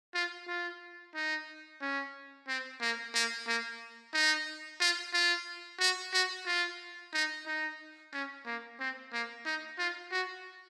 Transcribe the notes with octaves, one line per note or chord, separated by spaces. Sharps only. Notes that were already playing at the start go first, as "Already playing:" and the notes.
F4
F4
D#4
C#4
C4
A#3
A#3
A#3
D#4
F4
F4
F#4
F#4
F4
D#4
D#4
C#4
A#3
C4
A#3
D#4
F4
F#4